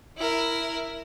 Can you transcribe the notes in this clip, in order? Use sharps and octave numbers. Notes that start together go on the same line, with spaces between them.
E4 A#4